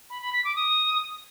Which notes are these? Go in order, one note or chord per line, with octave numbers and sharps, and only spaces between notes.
B5
B5
B6
D6
D#6